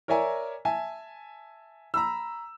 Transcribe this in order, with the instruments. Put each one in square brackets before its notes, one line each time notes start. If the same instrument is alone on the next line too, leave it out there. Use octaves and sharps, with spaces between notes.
[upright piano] A#4 C#5 D5 E5 G#5 A#5
E5 G#5 A5
A#5 B5 E6